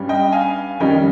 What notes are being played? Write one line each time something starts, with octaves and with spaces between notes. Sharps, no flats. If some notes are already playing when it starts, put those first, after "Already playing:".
Already playing: G2 G3 C#4
D#5 G5
F5 G#5
F2 D#3 G3 C#4 D#5 G5